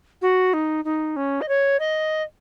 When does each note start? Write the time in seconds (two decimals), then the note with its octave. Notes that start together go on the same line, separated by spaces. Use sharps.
0.22 F#4
0.53 D#4
0.85 D#4
1.16 C#4
1.41 D#5
1.48 C#5
1.80 D#5